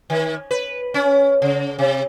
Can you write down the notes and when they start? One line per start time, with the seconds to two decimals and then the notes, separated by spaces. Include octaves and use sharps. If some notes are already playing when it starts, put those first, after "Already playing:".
0.10 D#3
0.51 B4
0.94 C#4
1.42 C#3
1.79 C3